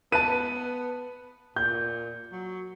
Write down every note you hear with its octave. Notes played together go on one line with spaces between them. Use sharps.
B3 B4 A5 D#7
A#2 G6
F#3